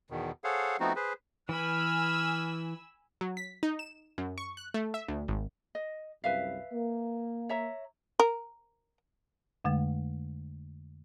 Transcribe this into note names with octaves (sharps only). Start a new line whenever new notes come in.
E2 B2 D#3
G#4 A4 C5 C#5 F5 F#5
F3 A3 B3 C4 D#4 F#4
G#4 B4 C5
E3 B4 G#5 B5 E6 F6
F#3
B6
D#4
E7
F#2
C#6
F#6
A3
E5
D2
G#1
D#5
C2 F#2 B4 E5 F5
A#3
C#5 E5 A#5
A#4
F2 D3 G#3 A3